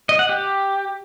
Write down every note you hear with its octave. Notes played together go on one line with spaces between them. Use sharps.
D#5
F#5
G4